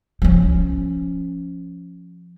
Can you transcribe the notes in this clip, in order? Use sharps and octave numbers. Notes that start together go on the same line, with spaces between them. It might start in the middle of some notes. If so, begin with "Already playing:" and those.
F3 C#4